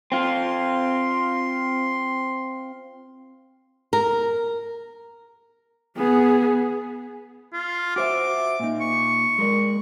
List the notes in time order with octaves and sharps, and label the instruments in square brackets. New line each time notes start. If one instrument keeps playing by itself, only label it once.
[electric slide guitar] C4 F4 [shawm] C6
[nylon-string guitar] A#4
[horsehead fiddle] B3 G#4
[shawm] F4
[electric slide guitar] F#4 C5 E5 [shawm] D6
[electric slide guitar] A#2 D#4
[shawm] C#6
[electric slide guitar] G#3 A#4 D5